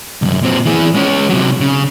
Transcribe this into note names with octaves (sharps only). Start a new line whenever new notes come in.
C2 F#2
A#2 C4
E3 G#4
G#3 C#4
C3 F#3
C#3